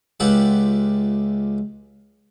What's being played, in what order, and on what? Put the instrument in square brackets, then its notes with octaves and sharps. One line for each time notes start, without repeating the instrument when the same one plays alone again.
[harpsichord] C#2 F4 G4 E5 F#5